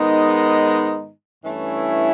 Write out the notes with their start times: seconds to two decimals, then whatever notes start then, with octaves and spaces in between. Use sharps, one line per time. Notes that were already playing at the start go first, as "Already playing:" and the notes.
Already playing: G#2 D#3 G#3 B3 D#4
1.44 G2 E3 A3 C#4 E4